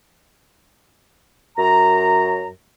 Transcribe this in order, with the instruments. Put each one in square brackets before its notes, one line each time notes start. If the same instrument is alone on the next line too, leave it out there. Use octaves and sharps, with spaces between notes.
[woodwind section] F#2 A#5